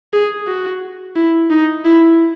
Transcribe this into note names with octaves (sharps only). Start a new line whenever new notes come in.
G#4
F#4
E4
D#4
E4